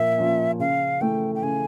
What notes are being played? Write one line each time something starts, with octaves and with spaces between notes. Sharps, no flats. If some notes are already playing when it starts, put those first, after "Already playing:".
Already playing: A#2 F3 A#3 E5
F3 A#3 C#4
C#3 F5
E3 A3 G5
G5
C#3 G#5